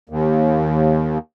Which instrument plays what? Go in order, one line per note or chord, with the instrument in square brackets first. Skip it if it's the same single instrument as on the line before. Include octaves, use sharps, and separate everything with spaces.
[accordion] D#2